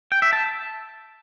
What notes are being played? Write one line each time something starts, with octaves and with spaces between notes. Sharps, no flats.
G5
E5
A5